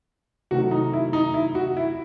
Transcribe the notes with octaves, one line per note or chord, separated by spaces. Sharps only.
C3 D#3 F#3 A3 F#4
D#4
E4
D#4
E4
F#4
E4